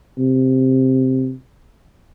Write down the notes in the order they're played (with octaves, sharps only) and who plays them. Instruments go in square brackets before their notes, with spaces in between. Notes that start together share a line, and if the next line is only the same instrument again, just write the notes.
[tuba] C3